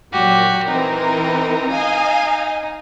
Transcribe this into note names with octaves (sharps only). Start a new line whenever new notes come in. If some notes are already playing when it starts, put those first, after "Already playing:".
A#2 F#3 F#4 G4
E3 C4 D#4 A#4
D#5 F5 G#5
D#4